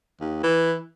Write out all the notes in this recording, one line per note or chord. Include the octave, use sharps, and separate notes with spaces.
D#2
E3